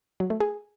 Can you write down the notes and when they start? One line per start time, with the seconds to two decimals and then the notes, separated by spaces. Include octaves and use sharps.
0.20 F#3
0.30 A3
0.40 G#4